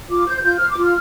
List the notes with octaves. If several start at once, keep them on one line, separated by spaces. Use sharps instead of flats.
F4 D6
C5 G6
F4 G6
C5 F6
D6
F4
F6